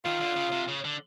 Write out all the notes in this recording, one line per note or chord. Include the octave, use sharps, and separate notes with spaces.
D#3 F4
D3
C#3
C3
C#3
D3